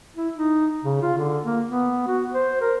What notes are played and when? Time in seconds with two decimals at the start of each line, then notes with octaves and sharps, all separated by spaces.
0.16 E4
0.36 D#4
0.84 C#3
1.02 F4
1.17 D3
1.45 A#3
1.69 B3
2.07 F#4
2.33 C5
2.61 A#4